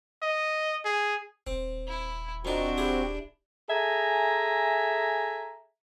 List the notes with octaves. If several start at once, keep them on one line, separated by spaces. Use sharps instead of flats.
D#5
G#4
D#1 C4
E4
F2 C4 D4 D#4 F#4
E4 G4 G#4
G#4 A4 E5 G#5 A#5